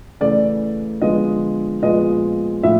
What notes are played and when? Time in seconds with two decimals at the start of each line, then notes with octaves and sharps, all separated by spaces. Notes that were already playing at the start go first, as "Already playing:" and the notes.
0.21 C#3 E3 A3 D5
1.02 D3 F3 G#3 B3 D#5
1.82 A#2 F3 G#3 B3 D#5
2.63 A2 F3 E5